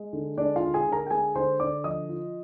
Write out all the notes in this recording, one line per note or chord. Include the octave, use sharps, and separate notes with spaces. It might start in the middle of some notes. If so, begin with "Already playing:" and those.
Already playing: G#3
D3
G#3 D4 D5
F4 F5
D3
G#4 G#5
D3
A#4 A#5
G5
G#3 G#4 G#5
D3 C5 C6
D3 D5 D6
F3 D#5 D#6
F4